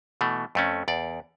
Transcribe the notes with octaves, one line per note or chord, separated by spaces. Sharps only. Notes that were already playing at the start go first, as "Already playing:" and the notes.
B2 E3 A3
F2 A3 C#4
E2 D5